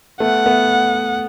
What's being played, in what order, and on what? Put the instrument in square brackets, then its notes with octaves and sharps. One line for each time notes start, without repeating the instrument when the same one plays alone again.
[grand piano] A3 B3 [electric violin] F#5
[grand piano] A3 B3